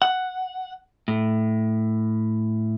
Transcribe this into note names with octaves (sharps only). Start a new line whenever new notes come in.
F#5
A2